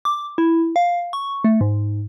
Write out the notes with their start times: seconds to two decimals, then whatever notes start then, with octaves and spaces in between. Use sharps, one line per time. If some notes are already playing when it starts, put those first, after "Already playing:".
0.05 D6
0.38 E4
0.76 F5
1.13 C#6
1.44 A3
1.61 G#2